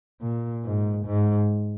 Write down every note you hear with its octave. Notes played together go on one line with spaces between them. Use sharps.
A#2
G#2
G#2